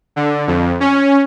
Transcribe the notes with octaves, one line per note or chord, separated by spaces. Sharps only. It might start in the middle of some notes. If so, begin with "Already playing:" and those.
D3
F2
C#4